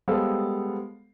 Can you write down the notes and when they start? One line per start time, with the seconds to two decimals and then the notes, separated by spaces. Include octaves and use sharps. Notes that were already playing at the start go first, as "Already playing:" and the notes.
0.08 G3 G#3 B3 A4 C5 F5